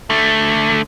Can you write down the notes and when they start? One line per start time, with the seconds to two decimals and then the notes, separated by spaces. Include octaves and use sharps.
0.10 D3 A3